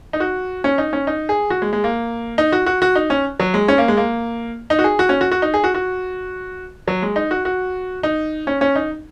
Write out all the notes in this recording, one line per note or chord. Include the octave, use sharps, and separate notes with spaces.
D#4
F#4
C#4
D#4
C#4
D#4
G#4
F#4
G#3
G#3
A#3
D#4
F#4
F#4
F#4
D#4
C#4
F#3
G#3
C#4
A#3
G#3
A#3
D#4
F#4
G#4
F#4
C#4
F#4
F#4
D#4
G#4
F#4
F#4
F#3
G#3
D#4
F#4
F#4
D#4
C#4
C#4
D#4